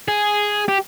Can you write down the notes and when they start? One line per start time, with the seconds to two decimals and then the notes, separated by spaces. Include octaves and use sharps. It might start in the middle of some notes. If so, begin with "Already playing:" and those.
0.08 G#4
0.68 G4